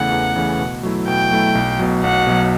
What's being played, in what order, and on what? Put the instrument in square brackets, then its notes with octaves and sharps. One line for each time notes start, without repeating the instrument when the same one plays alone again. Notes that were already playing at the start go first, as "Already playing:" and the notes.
Already playing: [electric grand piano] E2 C#3 E3 A3 [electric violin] F#5
[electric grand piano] E2
C#3 E3 A3
B2
F#3 A3 E4
[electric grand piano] B2 [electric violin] G5
[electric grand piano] F#3 A3 E4
B1
B2 F#3
[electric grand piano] B1 [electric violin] F#5
[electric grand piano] B2 F#3